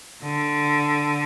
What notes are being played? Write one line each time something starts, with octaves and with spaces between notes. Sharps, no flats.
D3